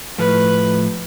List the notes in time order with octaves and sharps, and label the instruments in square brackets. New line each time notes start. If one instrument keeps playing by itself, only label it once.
[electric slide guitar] A2 F3 A3 [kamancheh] B4